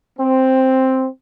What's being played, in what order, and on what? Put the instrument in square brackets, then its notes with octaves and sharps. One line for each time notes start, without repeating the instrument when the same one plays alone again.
[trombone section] C4